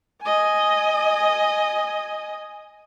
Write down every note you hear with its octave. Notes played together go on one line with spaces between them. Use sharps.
D#5 G#5